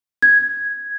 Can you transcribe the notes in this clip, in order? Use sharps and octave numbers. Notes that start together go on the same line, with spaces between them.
G#6